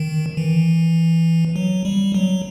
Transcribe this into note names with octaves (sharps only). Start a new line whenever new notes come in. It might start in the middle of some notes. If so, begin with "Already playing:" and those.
Already playing: D#3
E3
F#3
G3
F#3